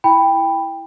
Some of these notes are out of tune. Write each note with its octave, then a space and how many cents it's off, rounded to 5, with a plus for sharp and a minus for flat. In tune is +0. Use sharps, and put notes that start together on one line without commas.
E4 +0 G5 +15 B5 +0